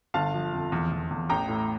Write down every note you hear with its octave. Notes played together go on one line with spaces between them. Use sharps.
G1 F5 A5
F3
F2
E2
E2
E2
A1 G5 A#5
A2